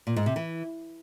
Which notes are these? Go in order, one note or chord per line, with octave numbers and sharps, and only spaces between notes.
A#2
G#2
C3
E3